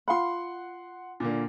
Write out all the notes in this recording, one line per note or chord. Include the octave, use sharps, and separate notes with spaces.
F4 F5 F#5 B5 C6
A#2 D3 A#3